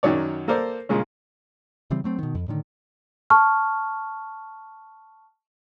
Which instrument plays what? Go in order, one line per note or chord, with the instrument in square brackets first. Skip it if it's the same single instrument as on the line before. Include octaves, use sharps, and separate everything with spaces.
[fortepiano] F#2 D#3 F#3 C#5 D5
A#3 A4 A#4 C5 D5
G2 A#2 C#3 G#3 C#4
[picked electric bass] C#3 E3 G3 C4
F#3 A3 C4
B2 D#3
F2
A2 D3 D#3
[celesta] A5 C#6 F6